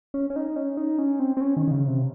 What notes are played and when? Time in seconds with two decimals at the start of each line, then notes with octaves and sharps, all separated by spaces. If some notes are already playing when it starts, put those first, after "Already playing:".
0.14 C#4
0.30 C#4
0.36 D#4
0.56 C#4
0.77 D#4
0.98 C#4
1.20 C4
1.37 C4
1.41 C#4
1.57 D#3
1.67 D#3
1.71 C#3
1.88 C3